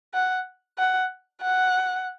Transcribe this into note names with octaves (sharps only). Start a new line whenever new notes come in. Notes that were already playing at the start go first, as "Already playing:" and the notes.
F#5
F#5
F#5